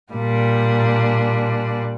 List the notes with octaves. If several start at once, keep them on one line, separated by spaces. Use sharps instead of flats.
A#2 G3 D4